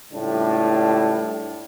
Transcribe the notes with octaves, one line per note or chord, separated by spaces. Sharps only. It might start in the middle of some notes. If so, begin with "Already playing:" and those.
C#2 A2 G3 D4